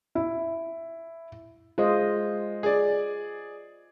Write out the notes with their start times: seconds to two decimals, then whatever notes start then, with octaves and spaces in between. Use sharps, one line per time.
0.15 E4
1.78 G#3 F4 C5 D#5
2.63 G#4 D5